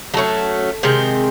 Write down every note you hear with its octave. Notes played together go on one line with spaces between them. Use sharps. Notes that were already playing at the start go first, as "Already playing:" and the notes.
F#3 A3 C#4 A5
C3 D#3 G#3 C4